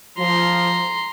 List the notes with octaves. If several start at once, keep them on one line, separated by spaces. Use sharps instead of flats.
F3 A#5 C6